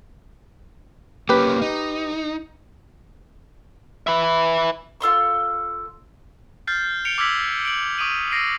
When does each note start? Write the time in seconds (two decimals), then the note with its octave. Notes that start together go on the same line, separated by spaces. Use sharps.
1.29 A#3 C#4 G4 B4
1.61 D#4
4.07 B4 E5
5.01 F4 A4 C6 C#6
6.67 F6 G6 A6 C7
7.05 C#7 D7 F7 G7
7.18 D6 E6 F6 G#6 B6 F#7
7.65 D7 F#7
7.98 C#6 D#6 D7 D#7 F#7
8.31 E6 A#6 C7 D7 D#7